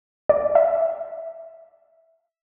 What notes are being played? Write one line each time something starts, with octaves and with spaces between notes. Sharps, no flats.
D5
E5